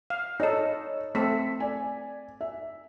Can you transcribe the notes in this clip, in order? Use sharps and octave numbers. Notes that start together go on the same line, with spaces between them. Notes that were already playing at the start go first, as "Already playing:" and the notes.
F5
D#4 A4 C#5 D#5
A3 C4 A4 B6
D5 G#5
E5